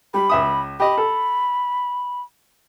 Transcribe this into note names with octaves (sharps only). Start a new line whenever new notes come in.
G3 B5
C#2 E5 D#6
G4 D#5 B5
A4